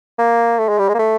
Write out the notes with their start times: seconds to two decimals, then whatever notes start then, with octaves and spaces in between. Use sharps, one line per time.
0.19 A#3
0.59 A3
0.69 G#3
0.79 G3
0.89 G#3
0.94 A#3
0.99 A3